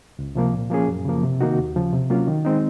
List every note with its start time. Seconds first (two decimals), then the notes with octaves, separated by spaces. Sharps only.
0.19 C#2
0.35 C3 F3 A#3
0.54 A#2
0.70 F3 A#3 C#4 G#4
0.88 F#2
1.05 C#3 F3 A#3
1.23 C3
1.41 D#3 A#3 D#4 F#4
1.59 D#2
1.76 C#3 F3
1.93 C3
2.10 F#3 A#3 C#4 F4
2.28 D#3
2.45 G#3 C4 D#4